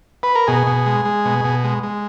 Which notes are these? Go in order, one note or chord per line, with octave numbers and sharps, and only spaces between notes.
B4
A#4
B2 G#4
B2
G#3
G#3
B2
B2
G#3
G#3